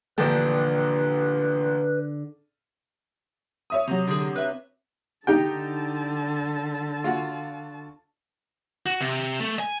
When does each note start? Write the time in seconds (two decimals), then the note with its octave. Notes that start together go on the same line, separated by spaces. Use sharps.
0.18 A1 A#2 D3 F3 A4 B4 G5
3.70 C#5 E5 D#6
3.88 C3 F#3 A#5
4.07 D3 G#4
4.36 B4 E5
5.27 D3 D#4 G4 G5 A5
7.04 F4 F#4
8.86 F#4
9.01 C3
9.40 A3
9.59 G#5